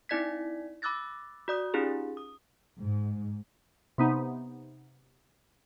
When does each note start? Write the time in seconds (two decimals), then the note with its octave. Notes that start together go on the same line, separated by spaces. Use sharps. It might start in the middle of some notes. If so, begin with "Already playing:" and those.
0.09 C4 D#4 E4 D5 G#6 B6
0.82 B5 D6 E6 F#6 A6 A#6
1.48 F#4 D5 D#6
1.74 C#4 D#4 F4 G4 G#4
2.17 D#6
2.81 G#2
3.98 C3 B3 D#4